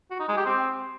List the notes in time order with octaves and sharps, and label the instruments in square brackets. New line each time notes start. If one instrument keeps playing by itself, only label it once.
[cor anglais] F#4
D#4
G#3
G4
C4